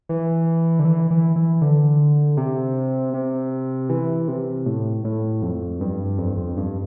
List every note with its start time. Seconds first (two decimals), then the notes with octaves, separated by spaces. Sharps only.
0.09 E3
0.79 D3
0.85 E3
1.11 E3
1.36 E3
1.61 D3
2.37 C3
3.14 C3
3.89 E3
4.28 C3
4.66 A2
5.04 A2
5.42 F2
5.81 G2
6.18 F2
6.37 F2
6.57 G2